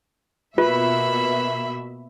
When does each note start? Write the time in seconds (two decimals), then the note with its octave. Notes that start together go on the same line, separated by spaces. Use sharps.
0.58 B2 A#3 F4 B4 E5 B5